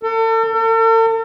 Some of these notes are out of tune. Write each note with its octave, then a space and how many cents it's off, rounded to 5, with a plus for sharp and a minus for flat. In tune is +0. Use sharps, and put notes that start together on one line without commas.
A4 +40
A4 +45